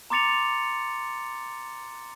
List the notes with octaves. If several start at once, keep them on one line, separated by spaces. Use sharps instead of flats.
A#5 C6 D6 A6 C#7 F7